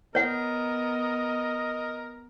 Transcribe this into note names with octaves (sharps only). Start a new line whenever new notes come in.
B3 A#4 C#5 D#5 F#5